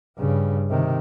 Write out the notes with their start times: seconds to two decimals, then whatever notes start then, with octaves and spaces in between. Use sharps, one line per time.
0.18 G2 C#3
0.69 C3 D#3